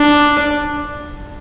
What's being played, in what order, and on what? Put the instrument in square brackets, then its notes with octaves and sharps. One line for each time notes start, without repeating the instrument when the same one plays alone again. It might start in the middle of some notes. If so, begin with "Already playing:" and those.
Already playing: [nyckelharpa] D4